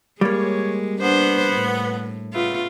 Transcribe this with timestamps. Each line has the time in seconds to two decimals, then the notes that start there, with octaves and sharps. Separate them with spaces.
0.21 G3 G#3 A#3 C#5
1.01 B3 D4 C5
1.53 A2
2.34 C#3 A3 B3 F4